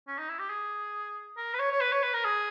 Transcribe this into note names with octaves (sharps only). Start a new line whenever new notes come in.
C#4
D#4
E4
G4
G#4
A#4
B4
C#5
C#5
B4
C#5
B4
A#4
G#4